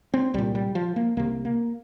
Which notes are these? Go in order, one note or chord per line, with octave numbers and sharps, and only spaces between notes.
C4
C2 A#2 G3
G3
F3
A#3
C2 C3 A#3
A#3